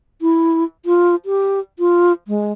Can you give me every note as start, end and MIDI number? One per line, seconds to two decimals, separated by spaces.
0.22 0.64 64
0.85 1.15 65
1.25 1.60 67
1.79 2.12 65
2.28 2.52 56